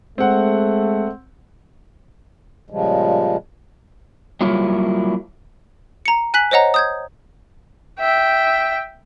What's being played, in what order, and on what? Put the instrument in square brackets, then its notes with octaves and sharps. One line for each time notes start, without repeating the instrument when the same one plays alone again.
[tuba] G#3 [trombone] A3 [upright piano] C4 F#5
[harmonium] A#2 C#3 F3 G3 G#3
[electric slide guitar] F#3 G3 A#3 E4 F4 C#5
[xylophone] A#5 C#7
G#5 F#6 B6 F#7
C5 C#5 D#5 F#5 A#5
D#6 G6 G#6
[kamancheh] E5 G5